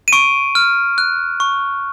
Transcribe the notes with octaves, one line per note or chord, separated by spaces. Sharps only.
D#7
C#6 D7
F6
F#6
C#6